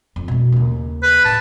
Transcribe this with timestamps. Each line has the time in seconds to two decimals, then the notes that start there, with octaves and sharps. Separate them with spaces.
0.16 F2
0.28 B2 A3
0.53 D#2 C#3
1.03 B4
1.25 A2 A5